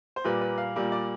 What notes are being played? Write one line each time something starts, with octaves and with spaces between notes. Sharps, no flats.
C5
A#2 G3 A#3 B4
B4
F5
A#2 G3 A#3
D5